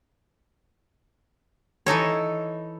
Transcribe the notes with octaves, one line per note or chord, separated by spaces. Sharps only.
E3 D#4 A4 C#5